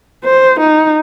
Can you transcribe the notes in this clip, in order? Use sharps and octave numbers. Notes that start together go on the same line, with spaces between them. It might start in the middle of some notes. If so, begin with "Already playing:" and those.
C5
D#4